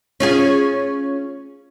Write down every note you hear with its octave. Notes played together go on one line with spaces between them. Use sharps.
C#4 F4 G#4